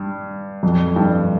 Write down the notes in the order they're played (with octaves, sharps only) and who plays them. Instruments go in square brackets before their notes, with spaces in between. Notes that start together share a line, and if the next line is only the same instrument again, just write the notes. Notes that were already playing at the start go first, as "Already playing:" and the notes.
Already playing: [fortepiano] G2
F2
G2